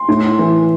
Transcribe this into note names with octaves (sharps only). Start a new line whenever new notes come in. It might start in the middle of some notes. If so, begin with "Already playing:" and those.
Already playing: C6
A2
E3